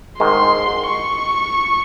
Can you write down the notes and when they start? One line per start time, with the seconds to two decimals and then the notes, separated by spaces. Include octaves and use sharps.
0.19 G#2 D#3 G#3 C6
0.87 C#6